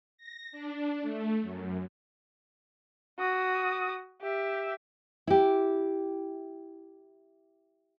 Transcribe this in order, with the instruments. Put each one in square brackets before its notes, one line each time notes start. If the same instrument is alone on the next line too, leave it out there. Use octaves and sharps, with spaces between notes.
[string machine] A#6
D4
A3
F#2
[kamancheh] F#4 D#6
G4 E5
[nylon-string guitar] E4 G4